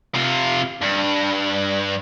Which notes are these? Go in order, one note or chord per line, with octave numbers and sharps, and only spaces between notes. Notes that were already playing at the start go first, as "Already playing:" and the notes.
C3 F4
G2